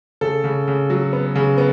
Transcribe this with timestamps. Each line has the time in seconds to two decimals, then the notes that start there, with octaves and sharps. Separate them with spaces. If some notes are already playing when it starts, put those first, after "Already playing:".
0.21 C#3 A4
0.44 C#3
0.68 C#3
0.90 F#3
1.13 B3
1.35 C#3
1.58 B3